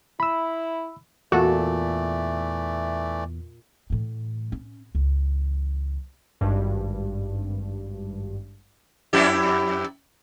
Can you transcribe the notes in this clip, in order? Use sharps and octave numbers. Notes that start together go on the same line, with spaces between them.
E4 B5 E6
E2 A#2 E3 A3 F#4 A4 D5
A2 E3
C#4
C#2 E3
G#1 G2
F2 E4 G4